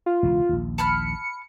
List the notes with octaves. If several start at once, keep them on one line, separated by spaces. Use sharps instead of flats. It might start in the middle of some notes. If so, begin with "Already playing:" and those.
F4
E1 C#2 E3
A#1 D#2
A5 B5 F6 C#7